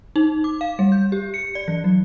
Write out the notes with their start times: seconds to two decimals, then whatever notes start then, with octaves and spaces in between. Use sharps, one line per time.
0.16 D#4
0.44 D6
0.61 F5
0.79 G3
0.92 G6
1.12 G4
1.34 C#7
1.55 D5
1.68 E3
1.84 F#3